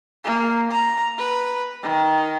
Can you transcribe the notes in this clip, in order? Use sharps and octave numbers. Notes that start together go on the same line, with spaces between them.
A#3
A#5
B4
D#3